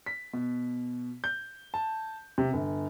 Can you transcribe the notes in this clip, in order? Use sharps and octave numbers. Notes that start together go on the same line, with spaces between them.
B6
B2
G6
A5
C3
G1